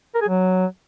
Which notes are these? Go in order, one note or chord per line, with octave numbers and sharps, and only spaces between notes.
A#4
G#4
F#3